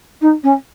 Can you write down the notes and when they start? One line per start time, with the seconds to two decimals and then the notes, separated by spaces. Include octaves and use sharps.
0.21 D#4
0.43 C#4